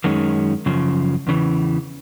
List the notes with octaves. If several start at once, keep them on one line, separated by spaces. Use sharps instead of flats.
F#2 D#3 G#3 C#4
F#2 C#3 F3
E2 C#3 E3